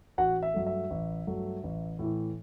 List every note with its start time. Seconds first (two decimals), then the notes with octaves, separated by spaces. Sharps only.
0.18 A1 F#4 F#5
0.43 E5
0.54 G2 F#3 A3
0.66 E5
0.90 A1
1.27 G2 F#3 A3
1.63 A1
1.99 A2 E3